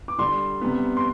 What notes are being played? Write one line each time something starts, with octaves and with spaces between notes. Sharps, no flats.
D6
D3 G3 D4 C6
C3 G3 B3
C6